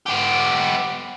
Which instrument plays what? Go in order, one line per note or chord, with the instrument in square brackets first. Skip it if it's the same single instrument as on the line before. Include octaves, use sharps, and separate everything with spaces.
[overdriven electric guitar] B3 G4